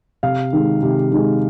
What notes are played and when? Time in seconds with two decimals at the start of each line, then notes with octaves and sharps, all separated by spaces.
0.23 C3 F5
0.53 D#3 G#3
0.83 C3
1.12 D#3 G#3